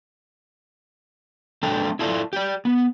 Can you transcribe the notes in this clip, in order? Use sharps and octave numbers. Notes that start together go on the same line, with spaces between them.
G#3 C4 D4 A4 G5
E4 F4 A4 D5
G4 D5
B3